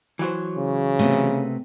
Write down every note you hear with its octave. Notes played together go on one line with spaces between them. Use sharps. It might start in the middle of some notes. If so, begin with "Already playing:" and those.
E3 F#3 C5
C#3
C3 A3 B3